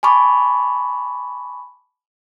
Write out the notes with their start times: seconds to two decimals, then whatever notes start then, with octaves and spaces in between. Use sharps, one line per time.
0.03 G#5 A5 B5 C#6 D6